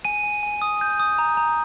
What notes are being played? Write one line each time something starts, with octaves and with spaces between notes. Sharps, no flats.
G#5 D#7
G#5
G#5
D#6
G6
D#6
A#5
A#5